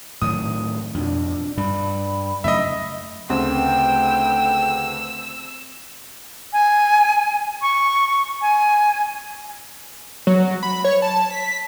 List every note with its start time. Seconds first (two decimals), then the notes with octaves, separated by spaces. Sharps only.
0.22 A2 D#3 F#3 D#6
0.94 F2 B2 D4
1.57 G2 G3 B5
2.44 F#2 C#3 A3 D#5 E5
3.30 D2 C#3 A3 C4 B4 G5 E6
6.53 G#5
7.62 C#6
8.42 G#5
10.27 F#3
10.63 B5
10.84 C#5
11.02 A5
11.31 B6